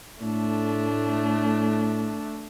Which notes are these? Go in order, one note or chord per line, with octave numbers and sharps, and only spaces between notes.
A2 A3 D4